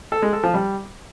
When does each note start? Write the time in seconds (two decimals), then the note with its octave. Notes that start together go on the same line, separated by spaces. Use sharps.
0.12 A4
0.22 G#3
0.33 A4
0.43 F3
0.54 G3